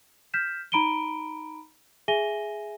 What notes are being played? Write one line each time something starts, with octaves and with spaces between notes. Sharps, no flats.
F6 G6 B6 E7
D#4 A#5 B5 D7 D#7 G7
G#4 E5 G#5 A#6 D#7 G7